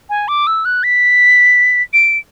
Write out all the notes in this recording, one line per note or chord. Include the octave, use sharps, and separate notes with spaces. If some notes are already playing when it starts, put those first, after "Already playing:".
G#5
D6
E6
F#6
B6
D7